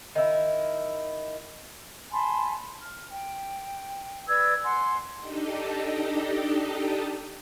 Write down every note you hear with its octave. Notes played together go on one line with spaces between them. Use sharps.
D#3 E4
G#5 A5 B5 C6
F6
G5
B4 D5 E6 G#6
F#5 G#5 C6
D4 D#4 G4 A4 D#5